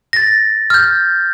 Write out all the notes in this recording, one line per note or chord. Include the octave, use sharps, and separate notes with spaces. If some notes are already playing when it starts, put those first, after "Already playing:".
A6 A#6
F6 G6